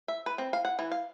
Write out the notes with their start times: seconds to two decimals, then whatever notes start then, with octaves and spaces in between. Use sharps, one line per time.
0.08 E5
0.26 B4
0.38 C4
0.53 F5
0.65 F#5
0.79 E3
0.91 F5